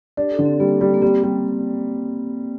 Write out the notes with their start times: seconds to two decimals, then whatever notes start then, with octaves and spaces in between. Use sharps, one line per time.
0.17 D4 G4
0.31 A4
0.39 D3
0.45 C4
0.60 G3 A#3
0.81 G3
0.94 A#3
1.02 G3 C4
1.23 G3